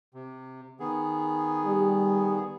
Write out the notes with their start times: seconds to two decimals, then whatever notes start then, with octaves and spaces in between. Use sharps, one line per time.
0.14 C3
0.80 D#3 B3 G#4
1.65 G3